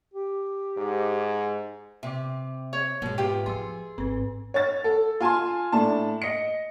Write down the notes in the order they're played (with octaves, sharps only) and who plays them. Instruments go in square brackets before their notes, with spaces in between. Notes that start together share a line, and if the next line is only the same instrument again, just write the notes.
[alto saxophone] G4
[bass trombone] G#2
[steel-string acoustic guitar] C3 [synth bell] E5 G5 D6
[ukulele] C#5
[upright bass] G#2 [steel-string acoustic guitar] B2 G#3
[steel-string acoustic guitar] A#3 B3 F4 [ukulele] G4 [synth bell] E5 G5
[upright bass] F3 [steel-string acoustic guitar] G#4 [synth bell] C6 E6
[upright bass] G#1 [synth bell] C4 B4
[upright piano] C#5 A6
A4
F4 G#5 A5 C6
A2 D4 A5
D#5 C#7